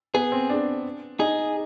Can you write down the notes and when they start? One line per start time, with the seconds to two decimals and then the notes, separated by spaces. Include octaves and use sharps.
0.14 B3 G#4
0.32 C4
0.49 D4
1.20 D#4 G#4